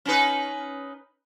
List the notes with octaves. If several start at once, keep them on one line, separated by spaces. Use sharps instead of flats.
C#4 D#4 B4